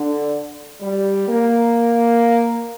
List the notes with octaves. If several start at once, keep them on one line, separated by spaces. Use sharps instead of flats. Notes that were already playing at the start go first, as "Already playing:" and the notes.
Already playing: D3
G3
A#3